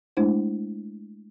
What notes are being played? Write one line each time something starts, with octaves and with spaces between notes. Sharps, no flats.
G#3 A3 D4 E4 C5